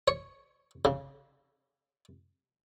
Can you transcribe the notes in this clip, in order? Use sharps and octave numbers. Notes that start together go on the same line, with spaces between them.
C#5
C#3